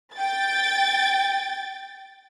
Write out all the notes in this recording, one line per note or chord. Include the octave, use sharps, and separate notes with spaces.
G5 A6